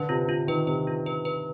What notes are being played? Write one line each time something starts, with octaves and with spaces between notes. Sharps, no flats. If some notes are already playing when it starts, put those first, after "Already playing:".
Already playing: D3 B4
C3 F4
D3 F4
D#3 B4
C3 B4
F4
B4
B4